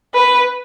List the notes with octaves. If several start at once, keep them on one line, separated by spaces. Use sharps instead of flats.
B4